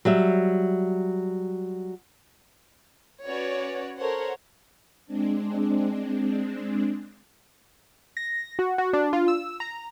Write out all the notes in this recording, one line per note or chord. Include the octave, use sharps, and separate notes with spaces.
F#3 G3 E5
C#4 F#4 B4 C#5 D5
A4 A#4 C5 C#5 F#5
G#3 C4 D4
A#6
F#4
F#4
D4
F4
E6
A#5